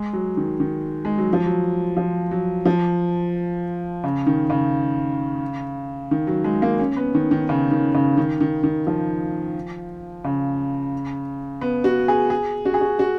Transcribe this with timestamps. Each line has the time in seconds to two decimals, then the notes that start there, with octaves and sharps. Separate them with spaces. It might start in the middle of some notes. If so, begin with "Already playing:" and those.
Already playing: G#3
0.13 F#3
0.37 D#3
0.60 D#3
1.05 G#3
1.18 F#3
1.33 F3
1.46 F#3
1.97 F3
2.31 F#3
2.65 F3
4.04 C#3
4.27 D#3
4.50 C#3
6.11 D#3
6.27 F#3
6.44 G#3
6.62 A#3
6.79 C#4
6.96 B3
7.15 D#3
7.31 D#3
7.49 C#3
7.71 D#3
7.94 C#3
8.17 D#3
8.40 D#3
8.63 D#3
8.87 F3
10.24 C#3
11.61 B3
11.84 F#4
12.08 G#4
12.30 G#4
12.65 F#4
12.74 G#4
12.81 F#4
12.99 F#4